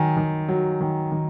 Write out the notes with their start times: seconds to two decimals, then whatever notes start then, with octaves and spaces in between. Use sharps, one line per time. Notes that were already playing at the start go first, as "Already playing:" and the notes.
Already playing: D#3 F#3 G#5
0.17 D#3
0.48 F#3
0.81 D#3
1.12 D#3